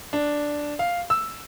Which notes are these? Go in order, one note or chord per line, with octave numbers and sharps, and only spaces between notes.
D4
F5
E6